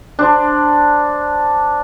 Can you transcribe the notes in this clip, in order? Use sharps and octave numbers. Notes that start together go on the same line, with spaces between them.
D4 C5